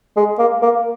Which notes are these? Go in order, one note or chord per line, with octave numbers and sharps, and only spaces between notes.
G#3
A#3
A#3